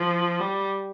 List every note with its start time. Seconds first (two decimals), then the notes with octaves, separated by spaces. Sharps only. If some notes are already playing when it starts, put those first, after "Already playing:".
Already playing: F3
0.40 G3